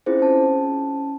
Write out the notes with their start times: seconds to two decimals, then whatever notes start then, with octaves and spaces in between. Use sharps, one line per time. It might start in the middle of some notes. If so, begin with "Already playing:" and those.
0.06 C4 C#4 E4 F4 G#4 C5
0.19 C#4 A5